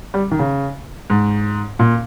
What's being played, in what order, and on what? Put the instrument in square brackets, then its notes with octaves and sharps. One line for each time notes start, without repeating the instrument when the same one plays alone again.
[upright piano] G3
D#3
C#3
G#2
A#2